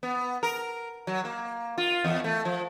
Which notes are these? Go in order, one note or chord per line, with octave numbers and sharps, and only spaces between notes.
B3
A#4
F#3
A#3
F4
E2
A3
F3